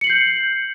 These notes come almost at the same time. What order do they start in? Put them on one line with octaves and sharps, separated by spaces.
C#7 F#7 C7 G6